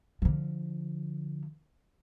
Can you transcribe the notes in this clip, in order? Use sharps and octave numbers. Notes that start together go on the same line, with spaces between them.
D3 F3